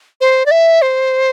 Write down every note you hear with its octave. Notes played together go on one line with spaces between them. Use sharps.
C5
D5
E5
C5